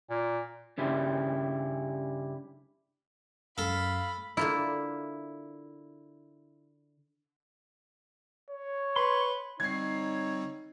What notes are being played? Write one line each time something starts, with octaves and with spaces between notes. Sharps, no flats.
A#2
G2 C#3 G3 E4
F#2 A4 F5 B5
D3 A#3 E4 F4
C#5
B4 B5 C6
D3 G3 C4 D#4 C#5 G#6 C7